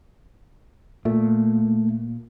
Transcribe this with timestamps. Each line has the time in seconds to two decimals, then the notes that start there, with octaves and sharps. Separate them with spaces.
1.05 A#2 A3